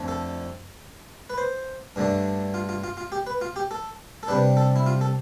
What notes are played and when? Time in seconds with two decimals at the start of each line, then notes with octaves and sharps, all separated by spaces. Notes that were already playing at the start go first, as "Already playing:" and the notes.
Already playing: F2 D3 F3 A3
0.08 A4
1.30 B4
1.38 C5
1.96 G2 D3 A3 D4
2.54 F4
2.69 F4
2.84 F4
2.97 F4
3.12 G4
3.27 B4
3.41 F4
3.56 G4
3.71 A4
4.23 A4
4.28 C3 G3 D4 B4
4.57 A4
4.76 E4
4.86 F4
5.01 A4